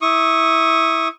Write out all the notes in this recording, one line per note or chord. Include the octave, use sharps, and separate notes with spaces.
E4 C#6 D#6